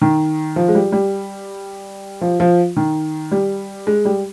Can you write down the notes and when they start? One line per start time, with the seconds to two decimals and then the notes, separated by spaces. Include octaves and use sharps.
0.02 D#3
0.56 F3
0.68 G#3
0.75 G3
0.92 G3
2.21 F3
2.40 F3
2.77 D#3
3.31 G3
3.87 G#3
4.05 G3